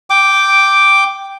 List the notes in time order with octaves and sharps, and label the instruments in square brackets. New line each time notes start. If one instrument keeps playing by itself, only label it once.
[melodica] G5 D6